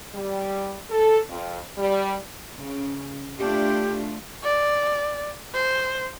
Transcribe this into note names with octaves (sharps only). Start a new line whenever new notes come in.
G3
A4
F2
G3
C#3
A3 D4 F4 G4
D5
C5